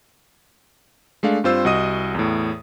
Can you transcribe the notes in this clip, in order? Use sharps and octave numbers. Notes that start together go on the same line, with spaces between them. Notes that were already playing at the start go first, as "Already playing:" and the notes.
G#3 A3 D4 F5
G2 C4 F4 C5 E6
C2 F#4 D#5 D#6 D#7
E2 A2